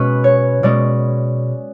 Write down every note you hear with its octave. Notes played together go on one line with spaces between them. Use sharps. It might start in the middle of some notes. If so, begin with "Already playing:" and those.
Already playing: B2 G#3 C#4 B4
C#5
B2 G#3 C#4 D5